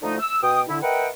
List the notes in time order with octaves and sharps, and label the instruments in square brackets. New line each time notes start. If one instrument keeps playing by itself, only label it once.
[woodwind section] D3 F3 A3 D#4
E6
B2 G5 D#6
D3 E4
A#4 B4 D#5 E5 F#5 G5